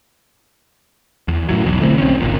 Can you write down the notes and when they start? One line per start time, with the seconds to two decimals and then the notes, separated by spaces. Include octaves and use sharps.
1.28 E2
1.49 A2 E3 F#3
1.65 E1 B1
1.81 D3 E3 A3 C4
1.98 B1 C4 C#4
2.20 G1 A#2